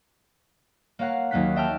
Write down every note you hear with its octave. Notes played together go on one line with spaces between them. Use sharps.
A#3 C#5 F5 F#5 A#5
D#2 F#3 A#3 C#4 F#6 B6
D#5 E5 G5 A5 F6